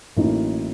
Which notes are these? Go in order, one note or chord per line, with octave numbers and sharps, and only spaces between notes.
A1 A2 F#3 A#3 D#4